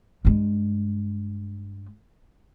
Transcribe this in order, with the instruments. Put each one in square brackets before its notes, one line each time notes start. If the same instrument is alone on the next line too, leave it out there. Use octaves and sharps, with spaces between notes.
[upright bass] G2 G#3